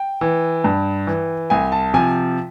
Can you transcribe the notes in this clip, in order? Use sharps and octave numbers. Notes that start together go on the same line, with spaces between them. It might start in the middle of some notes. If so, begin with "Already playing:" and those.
Already playing: G5
E3
G2
E3
C2 G#5
A5
C3 F3 G#5